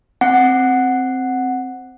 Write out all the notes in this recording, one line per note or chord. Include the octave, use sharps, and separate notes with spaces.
C4 F#5